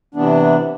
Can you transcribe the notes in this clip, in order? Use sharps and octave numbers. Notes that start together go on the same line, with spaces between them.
C3 E3 B3 D4